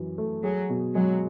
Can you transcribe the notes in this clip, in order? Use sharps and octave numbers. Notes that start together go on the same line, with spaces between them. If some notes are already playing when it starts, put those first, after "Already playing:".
Already playing: F#2 E3
A3
F#3 G#4
B2
F#3 G#3